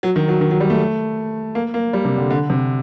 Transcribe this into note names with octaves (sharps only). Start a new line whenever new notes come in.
F#3
D#3
F#3
D#3
F#3
G3
A3
A#3
A#3
G3
C3
D3
D3
C3